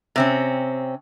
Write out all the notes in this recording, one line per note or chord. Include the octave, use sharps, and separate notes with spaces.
C3 C4 C#4